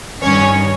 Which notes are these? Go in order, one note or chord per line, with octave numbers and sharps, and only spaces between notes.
G2 D#3 G3 C#4 C#5